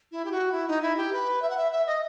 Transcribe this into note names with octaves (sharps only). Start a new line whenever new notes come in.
E4
G4
F#4
E4
D#4
E4
G4
B4
E5
F#5
E5
E5
D#5